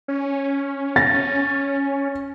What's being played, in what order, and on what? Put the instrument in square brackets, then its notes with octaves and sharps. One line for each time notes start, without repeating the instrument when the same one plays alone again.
[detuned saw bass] C#4
[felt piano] A6 A#6